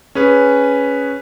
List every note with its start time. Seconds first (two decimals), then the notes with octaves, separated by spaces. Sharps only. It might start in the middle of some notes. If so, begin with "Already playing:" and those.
0.15 C#4 G#4 B4